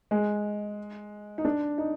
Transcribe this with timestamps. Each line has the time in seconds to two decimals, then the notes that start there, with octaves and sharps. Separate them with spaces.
0.11 G#3
1.38 D#4
1.45 D4
1.78 D#4